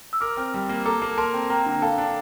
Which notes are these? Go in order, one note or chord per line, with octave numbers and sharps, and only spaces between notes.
E6
A#4 D6 F6
C4
G3
A#3
A4 A#5 D6
A#3
A#4 A5 C6
C4
A#3 G5 A#5
D3 G5
A4 F5 A5
D4